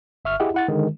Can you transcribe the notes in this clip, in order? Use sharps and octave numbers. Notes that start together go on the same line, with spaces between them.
G1 E5 C#6 F6
E4 G4 G#4 D#5 E5 F#5
E4 F#5 A6
D3 D#3 G#3